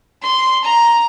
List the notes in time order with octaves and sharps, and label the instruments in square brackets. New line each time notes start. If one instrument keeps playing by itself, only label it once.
[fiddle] C6
A#5